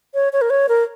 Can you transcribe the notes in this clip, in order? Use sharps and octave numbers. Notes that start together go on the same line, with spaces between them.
C#5
C#5
A#4
C#5
A#4